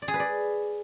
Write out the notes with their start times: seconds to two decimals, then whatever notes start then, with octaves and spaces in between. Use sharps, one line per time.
0.02 D5
0.08 G#4
0.14 B4
0.20 D5